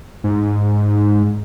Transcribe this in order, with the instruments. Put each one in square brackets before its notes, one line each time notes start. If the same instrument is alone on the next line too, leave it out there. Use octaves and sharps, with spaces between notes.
[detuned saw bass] G#2